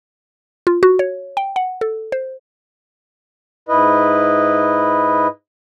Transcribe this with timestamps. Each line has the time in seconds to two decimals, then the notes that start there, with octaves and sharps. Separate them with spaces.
0.67 F4
0.83 F#4
0.99 C#5
1.37 G5
1.56 F#5
1.81 A4
2.12 C5
3.69 G#2 E4 B4 D#5